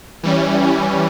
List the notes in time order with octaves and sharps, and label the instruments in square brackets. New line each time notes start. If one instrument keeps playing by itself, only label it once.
[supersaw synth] E3 G3 C#4